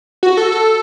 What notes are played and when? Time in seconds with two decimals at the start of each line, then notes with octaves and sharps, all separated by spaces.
0.23 F#4
0.37 A4
0.52 A4